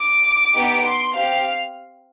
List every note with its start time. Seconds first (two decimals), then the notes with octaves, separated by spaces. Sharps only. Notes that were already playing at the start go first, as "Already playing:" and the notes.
Already playing: D6
0.53 B3 D#4 G4
0.84 C6
1.14 C4 G4 F5